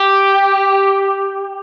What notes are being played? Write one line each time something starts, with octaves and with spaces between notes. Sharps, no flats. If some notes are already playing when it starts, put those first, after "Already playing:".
Already playing: G4